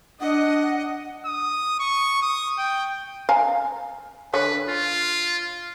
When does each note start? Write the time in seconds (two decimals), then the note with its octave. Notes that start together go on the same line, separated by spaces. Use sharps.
0.21 D4 D#5 F#5
1.26 D#6
1.80 C#6
2.22 D#6
2.58 G5
3.29 F5 G#5 A#5
4.33 D3 B4 C#5
4.68 F4